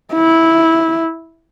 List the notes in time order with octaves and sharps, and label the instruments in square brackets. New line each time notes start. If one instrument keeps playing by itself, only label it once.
[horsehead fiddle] E4